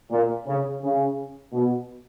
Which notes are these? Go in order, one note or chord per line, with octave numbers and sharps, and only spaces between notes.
A#2
C#3
C#3
B2